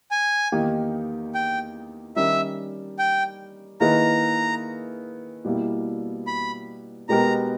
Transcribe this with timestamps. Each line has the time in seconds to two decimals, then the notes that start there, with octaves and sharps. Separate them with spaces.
0.11 G#5
0.52 E2 D#3 A#3 D#4 G4
1.34 G5
2.16 D#3 G3 C#4 G4 A#4 E5
2.99 G5
3.80 D#3 A#3 E4 G#4 B4 A#5
5.45 B2 G3 A#3 E4 G4
6.27 B5
7.09 B2 G#3 B3 G4 A#4 A#5